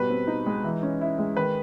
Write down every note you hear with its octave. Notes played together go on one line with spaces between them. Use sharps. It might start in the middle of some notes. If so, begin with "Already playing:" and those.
Already playing: B2 G3 B4
C4
D#4
G#3
E3
C#4
E4
G#3
D#3 B4